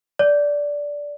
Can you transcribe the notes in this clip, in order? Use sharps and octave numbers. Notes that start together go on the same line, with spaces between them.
D5